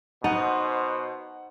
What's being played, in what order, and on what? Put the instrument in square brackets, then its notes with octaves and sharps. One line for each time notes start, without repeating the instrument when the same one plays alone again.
[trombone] B2 [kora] D#4 [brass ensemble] C5 [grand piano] F#5